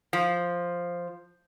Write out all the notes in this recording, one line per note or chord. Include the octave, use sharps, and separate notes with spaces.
F3